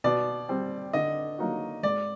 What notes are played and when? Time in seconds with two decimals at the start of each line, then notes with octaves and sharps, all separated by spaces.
0.04 B2 D5
0.49 G3 C4
0.93 D3 D#5
1.38 F#3 A#3 D#4 F#4
1.83 G#2 D5